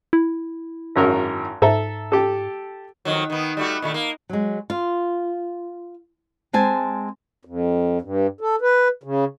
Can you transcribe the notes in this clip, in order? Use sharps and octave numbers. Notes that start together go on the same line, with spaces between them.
E4
G#1 F#2 A#4
G#2 A4 E5 A#5
G4 A4
F2 D#3 F#3
D#3 B3
G3 A3 F#4
A#2 D#3 A3
A#3
F#3 G#3
F4
G#3 C4 G#5 A5
F2
G2
A4
B4
C#3